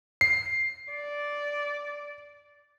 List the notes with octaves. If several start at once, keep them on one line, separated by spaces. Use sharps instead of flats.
C7
D5